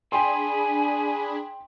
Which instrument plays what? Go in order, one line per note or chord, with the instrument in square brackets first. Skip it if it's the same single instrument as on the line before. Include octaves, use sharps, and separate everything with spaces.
[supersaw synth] D4 G#4 B5 [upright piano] G5 C6 [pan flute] G#5